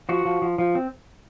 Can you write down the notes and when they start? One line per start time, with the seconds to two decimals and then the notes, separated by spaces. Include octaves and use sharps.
0.09 F3 F#4
0.25 F3
0.42 F3
0.58 F3
0.75 C4